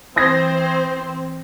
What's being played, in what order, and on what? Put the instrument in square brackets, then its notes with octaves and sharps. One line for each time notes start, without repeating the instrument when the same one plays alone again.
[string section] E3 C5 [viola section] C4 [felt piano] D#6 G#6 A#6